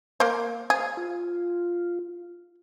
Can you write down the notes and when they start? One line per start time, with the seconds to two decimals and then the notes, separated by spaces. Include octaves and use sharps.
0.20 A#3 C5
0.70 G#4 C5 F5
0.97 F4